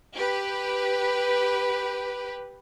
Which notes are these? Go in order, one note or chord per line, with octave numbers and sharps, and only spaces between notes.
G4 B4